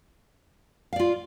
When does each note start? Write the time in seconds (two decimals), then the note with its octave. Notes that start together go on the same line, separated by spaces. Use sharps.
0.93 F5
0.96 D5
0.99 F4